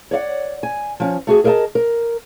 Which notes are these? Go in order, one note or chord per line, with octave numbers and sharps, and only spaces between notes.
C#5 D5 F5 F#5
G#5
F3 C#4
A3 F#4 G#4
G#4 A#4 D#5 E5 A5
A#4